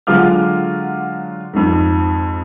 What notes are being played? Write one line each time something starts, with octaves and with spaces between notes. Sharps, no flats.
D3 F#3 G#3 F4 D6 F6
F2 G#2